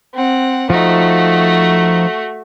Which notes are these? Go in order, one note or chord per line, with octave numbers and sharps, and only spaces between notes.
C4 F#5
F3 A3 D#4 F#4